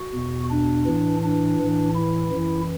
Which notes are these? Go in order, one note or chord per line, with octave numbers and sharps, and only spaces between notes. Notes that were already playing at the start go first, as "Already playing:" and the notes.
Already playing: F#4
E2 B2
D4
A2 E3
D4
A2 E3
E4
F#2 E3